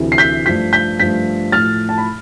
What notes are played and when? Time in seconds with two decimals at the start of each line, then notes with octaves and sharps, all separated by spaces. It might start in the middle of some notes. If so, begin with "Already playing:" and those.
Already playing: D2 C3 E3
0.12 C7
0.18 G6 B6
0.46 G2 F3 A3 G6 B6
0.73 G6 B6
0.99 G2 F3 A3 G6 B6
1.52 A2 F3 A3 F6 A6
1.89 A5
1.98 B5